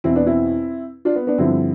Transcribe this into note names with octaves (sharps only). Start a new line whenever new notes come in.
E2 B2 C4 E4
B3 D4
C4 E4
D4 F4
B3
B3 D4
G2 D3 F3 C4 E4